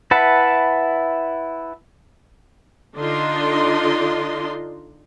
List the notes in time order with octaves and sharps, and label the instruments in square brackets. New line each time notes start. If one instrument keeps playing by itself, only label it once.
[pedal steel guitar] E4 B4 E5 F#5 A5
[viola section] D3 D4 D#4 F4 D#5 C6